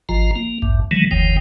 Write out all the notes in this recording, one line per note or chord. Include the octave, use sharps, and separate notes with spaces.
G#1 F3 F4 A#5
A#3
A1 D2 G2
D#3 E3 F#3 G#3 A3
F#1 D#2 D#3 F3 G5